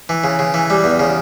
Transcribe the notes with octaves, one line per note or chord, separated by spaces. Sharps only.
E3
C#3
C#3
E3
G3
E2
C#3